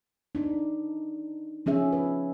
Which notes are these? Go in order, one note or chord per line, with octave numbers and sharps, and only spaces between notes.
D4 D#4
F3 C#4 G#4 E5
B4